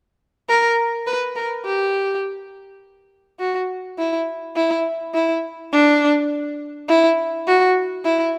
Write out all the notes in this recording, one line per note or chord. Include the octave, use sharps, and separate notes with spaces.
A#4
B4
A#4
G4
F#4
E4
E4
E4
D4
E4
F#4
E4